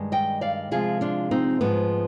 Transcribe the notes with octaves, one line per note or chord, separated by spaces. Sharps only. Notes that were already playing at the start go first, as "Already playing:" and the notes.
Already playing: G2 D#3 G#3
D#5 G5
D5 F5
C3 F3 G#3 F4 G#4
D4 F4
C4 D#4
G#2 F3 G#3 B3